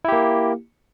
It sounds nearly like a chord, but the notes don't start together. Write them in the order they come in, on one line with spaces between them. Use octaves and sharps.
E4 G4 A#3